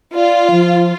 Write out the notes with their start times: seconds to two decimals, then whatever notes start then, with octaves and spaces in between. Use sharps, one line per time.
0.14 F4 D5
0.51 F3